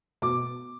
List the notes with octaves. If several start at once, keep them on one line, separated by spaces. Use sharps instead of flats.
B2 D6